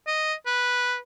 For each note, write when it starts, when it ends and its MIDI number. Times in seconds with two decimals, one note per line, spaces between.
0.07 0.34 75
0.46 0.97 71